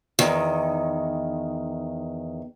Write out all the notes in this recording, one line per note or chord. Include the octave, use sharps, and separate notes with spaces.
E2 D#3